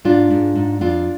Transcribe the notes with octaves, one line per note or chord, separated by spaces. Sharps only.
G#2 D4 F4
G#2
G#2
F2 D4 F4